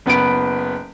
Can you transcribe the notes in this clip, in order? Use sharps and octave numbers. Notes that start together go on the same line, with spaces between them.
F#1 B3 B4 D7